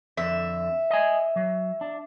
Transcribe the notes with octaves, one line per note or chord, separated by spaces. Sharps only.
F2 D3 E5
D#5 G#5
F#3
D4